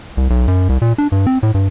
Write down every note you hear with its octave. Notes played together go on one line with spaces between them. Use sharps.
C2
B1
F#2
C2
A#2
D4
G2
C4
A2
G2